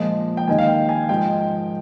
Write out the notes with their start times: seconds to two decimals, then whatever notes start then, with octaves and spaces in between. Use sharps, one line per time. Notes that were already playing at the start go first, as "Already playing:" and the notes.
Already playing: A#2 F3 G#3
0.37 G5
0.48 D#2 D#3 G#3 G#5
0.58 F5
0.68 G5
0.89 G#5
1.09 G#2 F3 G#3 G5